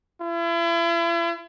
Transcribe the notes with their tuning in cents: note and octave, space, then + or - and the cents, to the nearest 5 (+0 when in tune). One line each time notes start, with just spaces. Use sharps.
E4 +40